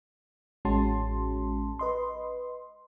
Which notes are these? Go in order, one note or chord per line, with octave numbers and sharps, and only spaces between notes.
A1 G#3 C#4 F#4 A5 C6
B4 D#5 C6